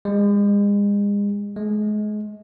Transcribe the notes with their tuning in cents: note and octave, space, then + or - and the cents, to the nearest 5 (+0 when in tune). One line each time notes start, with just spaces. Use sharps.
G#3 -35
G#3 +30